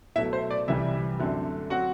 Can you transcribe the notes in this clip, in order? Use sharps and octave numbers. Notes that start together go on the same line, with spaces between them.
B2 F#3 A3 E4 E5
C5
D5
C2 C3 E3 G3 E4 E5
F#2 D3 A3 C4
F#3 C4 F#4 F#5